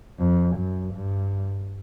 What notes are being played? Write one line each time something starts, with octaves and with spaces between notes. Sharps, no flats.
F2
F#2
G2